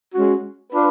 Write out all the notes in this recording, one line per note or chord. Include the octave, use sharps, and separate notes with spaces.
G#3 C#4 F#4
D4 F4 B4